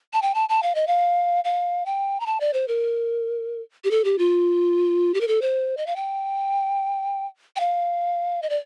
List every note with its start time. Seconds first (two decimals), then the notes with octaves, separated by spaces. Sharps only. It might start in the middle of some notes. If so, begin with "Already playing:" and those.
0.13 A5
0.22 G5
0.35 A5
0.49 A5
0.63 F5
0.75 D#5
0.87 F5
1.44 F5
1.86 G5
2.20 A#5
2.26 A5
2.40 D5
2.53 C5
2.68 A#4
3.84 G4
3.91 A4
4.04 G4
4.18 F4
5.14 G4
5.21 A#4
5.28 A4
5.42 C5
5.77 D#5
5.87 F5
5.96 G5
7.56 G5
7.60 F5
8.42 D#5
8.50 D5